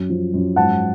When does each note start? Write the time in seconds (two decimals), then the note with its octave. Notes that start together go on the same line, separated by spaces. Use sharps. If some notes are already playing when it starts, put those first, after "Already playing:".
Already playing: F#2
0.09 F3
0.34 F#2
0.56 G#2 F#5 A5